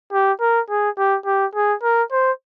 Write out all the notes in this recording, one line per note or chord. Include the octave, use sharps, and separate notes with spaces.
G4
A#4
G#4
G4
G4
G#4
A#4
C5